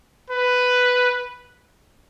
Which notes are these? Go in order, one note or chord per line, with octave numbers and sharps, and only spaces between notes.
B4